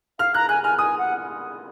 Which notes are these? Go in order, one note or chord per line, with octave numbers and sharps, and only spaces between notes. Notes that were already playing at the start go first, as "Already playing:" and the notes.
F5 F6
A#5 F#6
G#5 F#6
G#5 F6
G#5 D#6
F#5